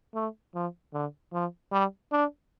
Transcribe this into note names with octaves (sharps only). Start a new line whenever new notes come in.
A3
F3
D3
F3
G3
D4